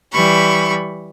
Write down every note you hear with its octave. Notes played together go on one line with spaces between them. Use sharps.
E3 G3 B5 C#6